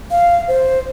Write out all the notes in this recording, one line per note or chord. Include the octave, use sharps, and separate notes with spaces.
F5
C5